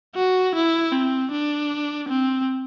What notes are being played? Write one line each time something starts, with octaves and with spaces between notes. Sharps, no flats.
F#4
E4
C4
D4
C4